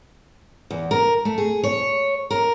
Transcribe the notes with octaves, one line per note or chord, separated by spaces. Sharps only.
E2
A#4
A3
G#4
C#5
A#4